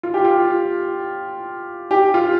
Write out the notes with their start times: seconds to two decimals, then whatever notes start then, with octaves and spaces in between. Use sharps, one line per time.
0.03 F4
0.14 G4
0.25 F4
1.91 G4
2.14 F4